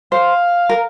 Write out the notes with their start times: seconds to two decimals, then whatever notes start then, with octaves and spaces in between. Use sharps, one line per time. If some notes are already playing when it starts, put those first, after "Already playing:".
0.12 C5 F5
0.69 A#4